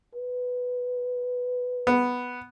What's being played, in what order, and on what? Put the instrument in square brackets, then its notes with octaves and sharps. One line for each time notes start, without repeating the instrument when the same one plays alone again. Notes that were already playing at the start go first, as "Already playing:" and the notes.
[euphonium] B4
[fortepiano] B3